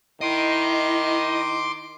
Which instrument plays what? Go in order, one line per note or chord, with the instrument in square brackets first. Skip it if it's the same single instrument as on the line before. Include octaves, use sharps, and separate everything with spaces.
[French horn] D#3 [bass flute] E4 [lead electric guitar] D#5 [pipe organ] C6 D6